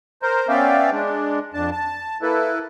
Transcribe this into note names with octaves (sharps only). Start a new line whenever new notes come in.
A#4 C5
B3 C#4 D5 E5 F5 G5
G#3 D4
F2 D4 A5
A5
A#3 E4 A4 B4